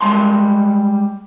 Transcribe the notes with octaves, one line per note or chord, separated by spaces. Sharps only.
G3 G#3 A5 C6